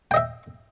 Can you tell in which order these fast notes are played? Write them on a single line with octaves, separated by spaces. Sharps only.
G5 D#5 E5